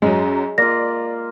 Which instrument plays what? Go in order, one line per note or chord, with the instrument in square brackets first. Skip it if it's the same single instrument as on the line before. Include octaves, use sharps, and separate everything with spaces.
[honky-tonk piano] F#2 F#3 [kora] G#3
[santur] A#3 F4 [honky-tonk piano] D5 [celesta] A#6